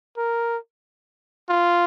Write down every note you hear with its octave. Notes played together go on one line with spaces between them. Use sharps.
A#4
F4